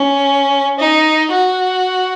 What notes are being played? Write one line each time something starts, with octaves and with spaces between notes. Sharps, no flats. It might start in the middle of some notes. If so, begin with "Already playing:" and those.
Already playing: C#4
D#4
F#4